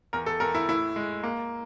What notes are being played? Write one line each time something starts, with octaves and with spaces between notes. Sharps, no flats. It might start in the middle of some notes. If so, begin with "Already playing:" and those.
E2 A#4
A4
E2 A#4
E4
A2 E4
G#3
A#3